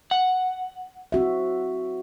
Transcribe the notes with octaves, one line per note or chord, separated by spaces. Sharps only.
F#5
C4 F#4 E5